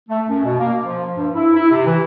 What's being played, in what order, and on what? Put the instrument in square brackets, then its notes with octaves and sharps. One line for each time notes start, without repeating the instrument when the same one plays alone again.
[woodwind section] A3
F#2
B2
A#3
F3
G2
E4
E4
C3
E3